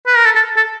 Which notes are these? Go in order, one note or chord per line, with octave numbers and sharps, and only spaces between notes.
B4
A#4
A4
A4
A4